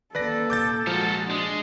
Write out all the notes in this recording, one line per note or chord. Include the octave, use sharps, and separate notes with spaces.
D#3 A#3 C#4 A4 B4 D5 A#6
D#1 C3 D6 G6 A6
F3 G#3 F#4 A4 A#4
G#3 D4